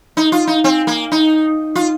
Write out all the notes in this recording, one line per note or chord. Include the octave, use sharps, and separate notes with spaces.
D#4
F4
D#4
C4
A#3
D#4
F4